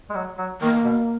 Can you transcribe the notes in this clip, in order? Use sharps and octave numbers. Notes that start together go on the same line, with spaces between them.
G#3
F#3
F#3
D#3 A#3
B2